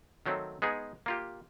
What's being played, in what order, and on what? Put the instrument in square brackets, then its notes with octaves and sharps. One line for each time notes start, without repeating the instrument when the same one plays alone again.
[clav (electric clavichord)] D#3 F#3 A3 C4
G#3 B3 D#4 G#4
A#3 F4 G4